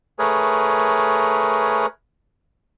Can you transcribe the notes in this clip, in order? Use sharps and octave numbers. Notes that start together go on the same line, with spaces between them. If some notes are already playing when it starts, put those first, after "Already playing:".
A3 G#4 A#4 B4 C#5